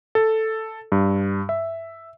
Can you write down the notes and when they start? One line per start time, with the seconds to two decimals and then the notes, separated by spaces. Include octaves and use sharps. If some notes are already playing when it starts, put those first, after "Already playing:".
0.15 A4
0.92 G2
1.49 E5